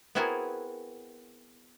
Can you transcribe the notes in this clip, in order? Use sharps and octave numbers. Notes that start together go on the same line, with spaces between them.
B3 C4 E4 F#4 G#4 A#4